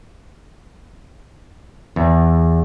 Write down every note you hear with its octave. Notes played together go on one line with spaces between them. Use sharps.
E2